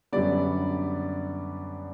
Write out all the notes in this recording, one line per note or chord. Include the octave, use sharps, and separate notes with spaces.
F#2 D3 G3 B3 D5